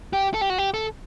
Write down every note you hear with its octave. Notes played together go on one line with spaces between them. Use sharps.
G4
A4
G4
F#4
G4
A4